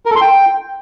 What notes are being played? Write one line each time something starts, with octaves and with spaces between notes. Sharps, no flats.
A#4
A4
C6
G5